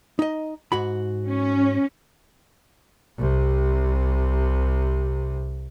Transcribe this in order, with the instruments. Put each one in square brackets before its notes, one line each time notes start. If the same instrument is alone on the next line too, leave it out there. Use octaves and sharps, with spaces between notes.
[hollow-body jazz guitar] D#4 D#5
G#2 F#4 B5
[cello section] C#4
[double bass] C2 C3